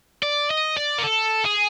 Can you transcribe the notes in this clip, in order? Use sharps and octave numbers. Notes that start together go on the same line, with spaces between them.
D5
D#5
D5
A#4
A4
G#4